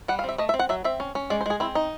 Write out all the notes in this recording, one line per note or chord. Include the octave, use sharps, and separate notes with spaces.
G3 F#5
F5
C4 E5
A3 D#5
E5
C4
F#5
F#3 E5
C4 E5
C#4
C#4
G#3 D5
C5
G#3 G#4
C4 E4
D#4